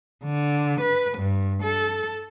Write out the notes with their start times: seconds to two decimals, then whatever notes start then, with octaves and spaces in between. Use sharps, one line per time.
0.24 D3
0.81 B4
1.18 G2
1.63 A4